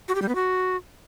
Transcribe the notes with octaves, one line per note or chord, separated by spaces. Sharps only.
F#4
G4
G3
B3
F#4